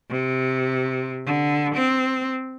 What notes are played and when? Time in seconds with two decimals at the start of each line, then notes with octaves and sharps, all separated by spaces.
0.10 C3
1.26 D3
1.75 C4